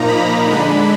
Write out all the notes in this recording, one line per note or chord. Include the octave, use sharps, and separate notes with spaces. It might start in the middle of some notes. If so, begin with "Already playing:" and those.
Already playing: A#2 F3 A#3 D#4 A#5
B5
D3 G#3 D4